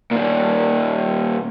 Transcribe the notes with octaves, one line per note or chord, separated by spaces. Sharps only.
A#2 D#3